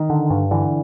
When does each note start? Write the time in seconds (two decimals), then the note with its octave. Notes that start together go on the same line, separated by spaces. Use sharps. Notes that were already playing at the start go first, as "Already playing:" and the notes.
Already playing: D#3
0.10 D3
0.30 G2
0.51 D3 E3